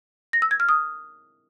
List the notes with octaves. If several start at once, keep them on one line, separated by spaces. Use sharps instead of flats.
A#6
E6
G#6
F6
D#6